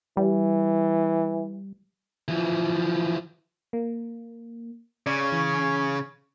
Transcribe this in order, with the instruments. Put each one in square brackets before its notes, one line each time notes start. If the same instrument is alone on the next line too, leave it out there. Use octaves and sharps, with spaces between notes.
[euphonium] E3 [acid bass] G3
[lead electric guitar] E3 F3
[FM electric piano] A#3
[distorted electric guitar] C#3 [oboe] C#4 [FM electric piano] D5
[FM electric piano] E3